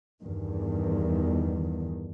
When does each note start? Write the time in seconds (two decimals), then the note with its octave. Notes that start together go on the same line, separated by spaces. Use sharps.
0.22 E2 G2 D#3